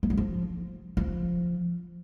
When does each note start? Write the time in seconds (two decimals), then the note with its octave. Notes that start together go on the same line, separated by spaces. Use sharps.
0.03 F3
0.10 F#3
0.17 F3
0.97 F3